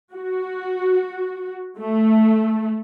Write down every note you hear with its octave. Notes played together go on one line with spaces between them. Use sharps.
F#4
A3